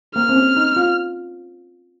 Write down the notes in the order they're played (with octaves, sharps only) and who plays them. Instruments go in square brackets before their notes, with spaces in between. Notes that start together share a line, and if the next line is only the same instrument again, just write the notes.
[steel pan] A#3 [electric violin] F6
[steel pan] C4
C#4
D#4
F4